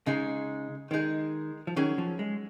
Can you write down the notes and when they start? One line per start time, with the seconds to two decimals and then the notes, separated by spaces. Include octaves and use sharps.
0.06 C#3 G#3 D#4 G#4
0.91 D#3 G#3 D#4 G#4
1.67 F3
1.76 D#3 F#3 C#4 G#4
1.98 F3
2.19 G#3